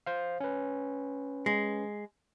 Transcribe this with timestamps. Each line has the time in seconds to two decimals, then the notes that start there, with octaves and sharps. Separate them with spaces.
0.06 C5 F5
0.40 C#4 B4
1.46 G#3